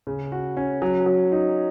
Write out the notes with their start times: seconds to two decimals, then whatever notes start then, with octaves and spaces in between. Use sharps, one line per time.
0.07 C#3
0.32 F#4
0.57 C#4
0.82 F#3
1.06 F#3
1.32 D#4